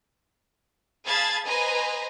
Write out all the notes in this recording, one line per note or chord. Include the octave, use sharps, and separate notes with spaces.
G#4 F5 A5 B5 G#6 A6
B4 C5 D#5 G#5 A#5